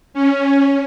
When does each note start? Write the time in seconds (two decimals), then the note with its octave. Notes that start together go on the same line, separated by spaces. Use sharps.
0.14 C#4